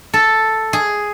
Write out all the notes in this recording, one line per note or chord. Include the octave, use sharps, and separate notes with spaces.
A4
G#4